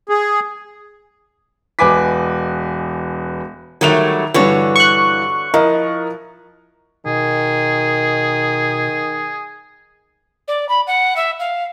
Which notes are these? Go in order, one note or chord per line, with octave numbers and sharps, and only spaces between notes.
G#4
E1 B4 G#5 D6 B6
D#3 F#3 G3 A3 F7
G2 D3 E3 F#4 C#5
C#6 F#6
F3 E4 A#4 D#5
B2 D#3 G#4
D5
B5
F#5
E5
F5